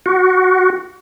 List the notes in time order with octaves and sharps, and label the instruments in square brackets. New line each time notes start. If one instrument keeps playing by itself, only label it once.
[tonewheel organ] F#4